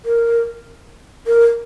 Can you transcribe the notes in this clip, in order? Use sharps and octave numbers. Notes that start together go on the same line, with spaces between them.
A#4
A#4